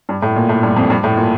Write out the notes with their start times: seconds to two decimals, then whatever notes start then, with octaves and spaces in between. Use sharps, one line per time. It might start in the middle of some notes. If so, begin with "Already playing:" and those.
0.09 G2
0.22 A2
0.36 A#2
0.49 A2
0.63 G2
0.76 F2
0.90 G2
1.04 A2
1.17 A#2